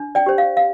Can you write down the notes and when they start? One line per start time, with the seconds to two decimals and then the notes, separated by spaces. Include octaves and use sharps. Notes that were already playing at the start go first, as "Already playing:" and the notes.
Already playing: D4
0.15 D5 G5
0.26 G4 C5
0.38 F5
0.57 F5